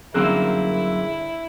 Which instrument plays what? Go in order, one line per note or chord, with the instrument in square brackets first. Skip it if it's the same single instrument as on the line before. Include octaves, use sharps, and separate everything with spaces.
[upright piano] G1 E6 F#6 [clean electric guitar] F#2 A#3 C4 [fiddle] E4 [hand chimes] G#4